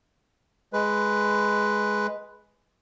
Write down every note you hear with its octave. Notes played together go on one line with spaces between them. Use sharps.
G#3 B4